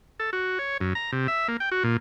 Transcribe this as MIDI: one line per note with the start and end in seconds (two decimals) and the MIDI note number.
0.20 0.30 69
0.33 0.58 66
0.59 0.77 73
0.81 0.94 42
0.95 1.11 82
1.12 1.27 48
1.28 1.48 76
1.48 1.57 58
1.60 1.70 79
1.71 1.83 66
1.84 1.97 46